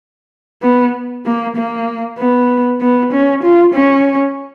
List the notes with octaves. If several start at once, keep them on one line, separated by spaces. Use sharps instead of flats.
B3
A#3
A#3
B3
B3
C#4
F4
C#4